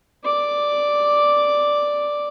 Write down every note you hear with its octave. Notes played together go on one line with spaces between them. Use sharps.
D5 D6